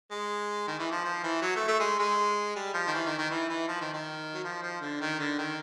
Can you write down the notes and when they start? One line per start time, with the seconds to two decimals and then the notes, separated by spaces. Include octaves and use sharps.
0.11 G#3
0.68 D#3
0.79 E3
0.92 F3
1.04 F3
1.24 E3
1.42 F#3
1.56 A3
1.68 A3
1.80 G#3
1.98 G#3
2.56 G3
2.74 F3
2.87 D#3
2.94 E3
3.06 D#3
3.18 D#3
3.30 E3
3.49 E3
3.68 F3
3.81 D#3
3.93 D#3
4.34 F#3
4.44 F3
4.62 F3
4.81 D3
5.01 D#3
5.19 D3
5.38 D#3